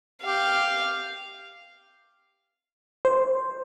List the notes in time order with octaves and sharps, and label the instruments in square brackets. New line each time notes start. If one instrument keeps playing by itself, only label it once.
[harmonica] G4 [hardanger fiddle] F5
[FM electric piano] C5